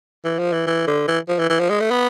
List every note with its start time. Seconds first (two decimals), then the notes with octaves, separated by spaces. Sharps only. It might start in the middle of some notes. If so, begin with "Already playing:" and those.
0.25 E3
0.39 F3
0.53 E3
0.67 E3
0.87 D3
1.08 E3
1.28 F3
1.39 E3
1.49 E3
1.60 F3
1.70 G#3
1.80 A3
1.91 B3